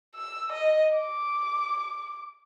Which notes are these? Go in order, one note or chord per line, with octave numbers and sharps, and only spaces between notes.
E6
D#5
D6